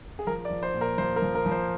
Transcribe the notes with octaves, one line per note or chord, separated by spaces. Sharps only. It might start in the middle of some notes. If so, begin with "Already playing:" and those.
G#4
F3 A#4
D5
F3
C5
A#2
A#4
F3 C5
A#4
F3
A#4
F3
C5